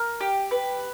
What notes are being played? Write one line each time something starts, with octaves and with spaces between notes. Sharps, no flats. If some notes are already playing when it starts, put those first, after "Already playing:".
Already playing: A#4
G4
B4